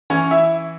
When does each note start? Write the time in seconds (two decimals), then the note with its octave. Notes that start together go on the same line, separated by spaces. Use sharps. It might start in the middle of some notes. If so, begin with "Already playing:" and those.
0.10 E3 C#4 C#5
0.31 E4 E5